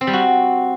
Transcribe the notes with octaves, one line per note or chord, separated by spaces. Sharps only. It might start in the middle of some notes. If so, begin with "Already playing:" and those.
C4
G3
F#4